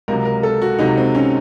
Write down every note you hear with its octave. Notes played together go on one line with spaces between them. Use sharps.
C#2 C3 F#3 A#4
A#4
A4
F#4
C#2 C3 F#3 D#4
C4
C#4